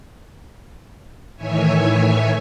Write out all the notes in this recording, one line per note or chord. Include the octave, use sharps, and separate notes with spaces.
A2 D#3 E3 C#5 E5 G#5